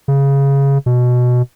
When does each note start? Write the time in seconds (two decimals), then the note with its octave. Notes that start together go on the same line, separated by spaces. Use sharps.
0.08 C#3
0.86 B2